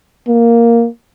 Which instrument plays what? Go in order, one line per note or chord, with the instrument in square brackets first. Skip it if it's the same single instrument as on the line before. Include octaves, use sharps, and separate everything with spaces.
[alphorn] A#3